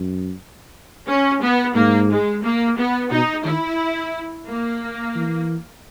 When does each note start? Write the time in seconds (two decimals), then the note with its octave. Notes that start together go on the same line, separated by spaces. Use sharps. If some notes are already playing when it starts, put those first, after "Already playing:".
Already playing: F#2
1.08 C#4
1.41 B3
1.75 G#2 A#3
2.10 G#3
2.44 A#3
2.78 B3
3.11 B2 D#4
3.45 D#3 E4
4.47 A#3
5.16 E3